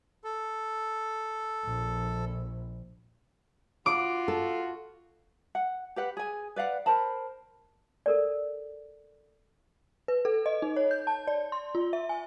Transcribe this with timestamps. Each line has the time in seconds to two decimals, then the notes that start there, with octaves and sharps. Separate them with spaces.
0.24 A4
1.64 A#1
3.86 F4 F#4 D6
4.28 A4
5.55 F#5
5.96 G4 B4 F#5
6.17 G#4 G#5
6.56 B4 D5 F5 F#5
6.86 A#4 C5 A5 B5
8.06 A4 A#4 D5
10.08 B4
10.25 A4
10.46 D#5
10.62 D#4
10.76 C#5
10.91 G6
11.07 A5
11.27 D5
11.52 C6
11.75 F4
11.93 E5
12.09 G#5